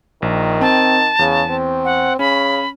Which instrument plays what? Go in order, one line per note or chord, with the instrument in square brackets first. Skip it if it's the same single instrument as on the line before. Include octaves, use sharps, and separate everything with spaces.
[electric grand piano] A#1 [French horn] D#3
[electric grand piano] C4 [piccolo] A5
[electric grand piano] E2 [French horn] C#3
[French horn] C4
[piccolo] F#5
[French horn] C#3 [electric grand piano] C#4 [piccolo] B5